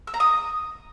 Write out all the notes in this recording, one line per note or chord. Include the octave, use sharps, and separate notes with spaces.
E6
A#5
D#6